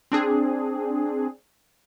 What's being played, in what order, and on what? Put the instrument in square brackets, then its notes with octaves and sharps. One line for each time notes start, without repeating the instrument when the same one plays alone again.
[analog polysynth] C4 D4 G#4